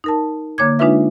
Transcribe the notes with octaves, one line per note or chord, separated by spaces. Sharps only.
D#4 A#4 A5
D3 A#3 C#5 D6 G#6
G#3 D4 D#4 F4 B4 E5